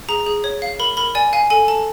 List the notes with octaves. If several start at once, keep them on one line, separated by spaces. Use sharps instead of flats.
G#4 A#5
G#4
C#5
F5
A#4 B5
A#4 B5
D5 G#5
F5 G#5
A4 G#5
A4 A5